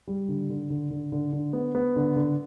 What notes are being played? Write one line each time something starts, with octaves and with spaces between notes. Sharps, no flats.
G3
D3
D3
D3
D3
D3
D3
B3
B3
D3
D3